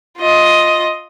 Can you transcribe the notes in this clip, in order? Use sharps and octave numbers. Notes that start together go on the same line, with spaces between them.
F4 D#5